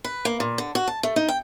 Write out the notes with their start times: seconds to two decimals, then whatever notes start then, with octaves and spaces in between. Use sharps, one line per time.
0.04 B4
0.25 A#3
0.40 A#2
0.58 D3
0.75 F#4
0.87 A5
1.03 A3
1.16 D#4
1.28 G5